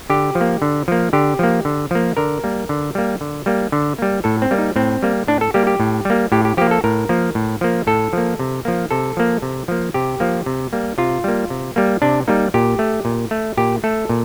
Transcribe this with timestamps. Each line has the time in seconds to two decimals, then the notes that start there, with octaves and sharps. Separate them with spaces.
0.10 D3 G4
0.35 F3
0.41 A#3
0.62 D3
0.88 F3 A#3
1.13 D3 G4
1.39 F3 A#3
1.65 D3
1.91 F3 A#3
2.17 D3 A#4
2.44 G3 A#3
2.69 D3
2.95 G3 A#3
3.21 D3
3.46 G3 A#3
3.72 D3
3.99 G3 A#3
4.24 A2 A4
4.42 C4
4.51 G3 A#3
4.58 D#4
4.76 A2 C4
5.02 G3 A#3
5.28 A2 D4
5.41 A4
5.54 G3 A#3 G4
5.67 G4
5.80 A2
6.05 G3 A#3
6.32 A2 G4
6.45 G4
6.57 F3 A#3 G4
6.71 A4
6.84 A2 A#4
7.09 F3 A#3
7.35 A2
7.61 F3 A#3
7.87 A2 A4
8.13 F3 A#3
8.39 C3
8.65 F3 A#3
8.91 C3 A4
9.17 F3 A#3
9.42 C3
9.68 F3 A#3
9.94 C3 G4
10.20 F3 A#3
10.46 C3
10.73 G3 A#3
10.98 C3 F4
11.24 G3 A#3
11.50 C3
11.76 G3 A#3
12.02 C3 D4
12.28 G3 A#3 D#4
12.54 A#2 G4
12.79 A3
13.05 A#2
13.31 A3
13.57 A#2 G4
13.84 A3 A4
14.09 A#2